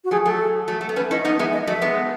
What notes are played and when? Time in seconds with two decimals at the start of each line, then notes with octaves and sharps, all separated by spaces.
0.04 F#4
0.11 F#3 A3 G#4
0.26 F#3 A3 A4
0.68 F#3 A3
0.81 A3
0.89 B3
0.96 A3 C#4 B4
1.11 C#4 E4 D#5
1.25 B3 D#4
1.39 G#3 B3 E5
1.53 D#5
1.67 F#3 A3 E5
1.82 G#3 B3